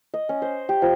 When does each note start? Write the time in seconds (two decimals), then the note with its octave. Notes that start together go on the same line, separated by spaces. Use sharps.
0.14 D#5
0.29 C#4
0.42 C5
0.69 G4
0.82 F3